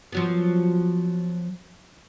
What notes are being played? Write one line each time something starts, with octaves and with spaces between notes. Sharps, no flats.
F3 F#3 B3